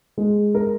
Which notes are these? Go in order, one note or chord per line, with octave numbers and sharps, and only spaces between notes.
G#3
A#4